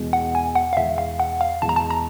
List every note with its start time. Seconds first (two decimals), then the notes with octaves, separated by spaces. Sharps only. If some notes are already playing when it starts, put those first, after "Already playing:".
Already playing: E2 B2 G#3
0.13 F#5
0.35 G#5
0.55 F#5
0.73 F5
0.77 E2 B2 G#3 E5
0.98 F5
1.20 F#5
1.41 F5
1.62 E2 B2 G#3 A5
1.69 A#5
1.76 A5
1.91 A#5